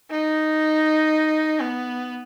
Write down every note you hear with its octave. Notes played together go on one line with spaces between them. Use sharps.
D#4
B3